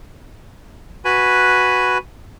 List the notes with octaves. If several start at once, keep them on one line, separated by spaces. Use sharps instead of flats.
F#4 B4 G#5 B5